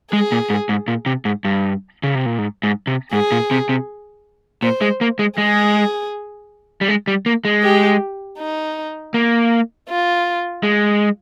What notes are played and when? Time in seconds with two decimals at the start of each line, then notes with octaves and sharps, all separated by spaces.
0.12 G#3 G#4
0.32 A#2
0.50 G#2
0.69 G#2
0.88 A#2
1.06 C3
1.25 G#2
1.45 G2
2.03 C#3
2.15 C3
2.26 A#2
2.38 G#2
2.63 G#2
2.87 C3
3.12 G#2 G#4
3.32 A#2
3.51 C3
3.69 C3
4.62 A#2 C5
4.81 G#3
5.01 A#3
5.19 G#3
5.38 G#3 G#4
6.81 G3
6.88 G#3
7.08 G3
7.26 A#3
7.45 G#3
7.63 G4
8.38 D#4
9.14 A#3
9.89 F4
10.63 G#3